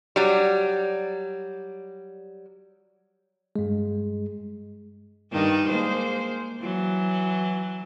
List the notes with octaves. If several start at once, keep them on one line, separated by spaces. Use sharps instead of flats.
F#3 G3
G2 G#3
G2 D#3 D#4
G#3 A#3 C5
E3 F#3